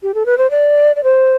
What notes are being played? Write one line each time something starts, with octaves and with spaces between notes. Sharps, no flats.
G4
A4
B4
C5
D5
D5
C5